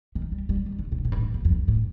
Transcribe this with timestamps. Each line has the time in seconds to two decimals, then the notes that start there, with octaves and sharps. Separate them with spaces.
0.15 D#3
0.32 G3
0.49 G3
0.66 D#3
0.79 D3
0.92 A#2
1.05 A#2
1.12 G2
1.17 A2
1.34 F2
1.45 F2
1.51 G2
1.68 A2